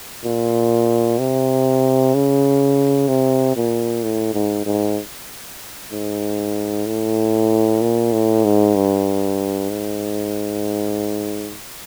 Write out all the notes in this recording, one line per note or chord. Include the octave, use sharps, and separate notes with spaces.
A#2
C3
C#3
C3
A#2
A2
G#2
G#2
G#2
A2
A#2
A2
G#2
G2
G#2